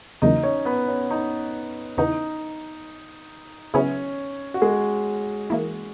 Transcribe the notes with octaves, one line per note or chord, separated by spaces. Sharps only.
E2 C#3 F#3 A#3 D#4 E4 D#5
C#4 C#5
B3 B4
C#4
D#4
E2 C#3 E3 B3 D#4
C#3 F#3 B3 C#4 E4 G#4 C#5
F#4
G#3 G#4
E3 A#3 E4